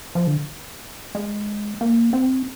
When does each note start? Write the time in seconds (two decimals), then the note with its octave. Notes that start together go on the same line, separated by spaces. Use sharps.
0.15 F3
0.27 D3
1.15 G#3
1.81 A#3
2.13 C4